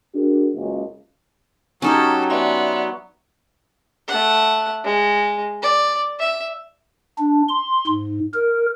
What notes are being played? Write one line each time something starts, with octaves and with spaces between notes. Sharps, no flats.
D4 F#4 G#4 A#4
F#1 C#2
F#3 C#4 D#4 G4 A4
B3 D5 E5 C6
A3 F#5
G#3
D5
E5
D4
C6
G#2
A#4